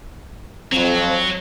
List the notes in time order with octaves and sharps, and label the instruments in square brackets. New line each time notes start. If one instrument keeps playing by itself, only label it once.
[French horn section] F2 [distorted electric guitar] F#3 [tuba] C4